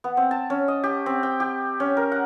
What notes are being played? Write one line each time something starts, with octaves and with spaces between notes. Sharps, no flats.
B3
C4
A5
C#4
D#5
G4
C4
G5
G4
C#4
A#4
F#5